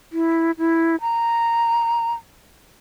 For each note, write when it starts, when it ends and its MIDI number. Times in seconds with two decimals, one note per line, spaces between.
0.13 0.51 64
0.58 0.96 64
1.01 2.13 82